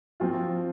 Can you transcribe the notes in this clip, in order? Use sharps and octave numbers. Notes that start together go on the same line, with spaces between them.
F3 C4 F4